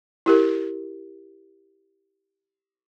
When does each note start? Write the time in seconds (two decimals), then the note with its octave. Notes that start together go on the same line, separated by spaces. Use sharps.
0.26 E4 G4 A#4